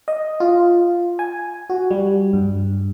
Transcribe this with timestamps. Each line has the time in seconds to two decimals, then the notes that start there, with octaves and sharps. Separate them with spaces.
0.08 D#5
0.40 F4
1.19 G#5
1.70 F#4
1.91 G3
2.33 G2